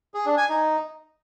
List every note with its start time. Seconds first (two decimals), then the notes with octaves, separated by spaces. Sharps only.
0.14 G#4
0.26 D4
0.37 G#5
0.49 D#4